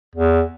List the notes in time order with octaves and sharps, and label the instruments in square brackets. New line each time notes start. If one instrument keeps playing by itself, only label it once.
[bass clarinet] E2